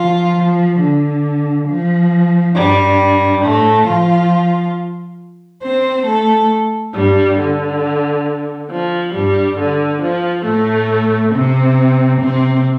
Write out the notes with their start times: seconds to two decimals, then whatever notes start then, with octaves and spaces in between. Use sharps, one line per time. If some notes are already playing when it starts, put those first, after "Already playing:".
Already playing: F3 F4
0.37 F3
0.80 D3
1.68 F3
2.55 G2 G3
3.44 A2 A3
3.87 F3 F4
5.63 C4 C5
6.07 A3 A4
6.95 G2 G3
7.39 D3
8.70 F3
9.14 G2 G3
9.58 D3
10.02 F3
10.46 A2 A3
11.33 C3 C4
12.21 C3 C4